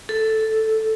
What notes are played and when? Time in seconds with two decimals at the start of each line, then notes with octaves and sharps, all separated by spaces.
0.09 A4